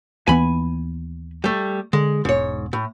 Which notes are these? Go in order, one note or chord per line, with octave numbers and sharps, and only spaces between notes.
D#2 E3 B3 G#5 B5
G3 A3
D3 G#3
E1 G#2 C#5
A2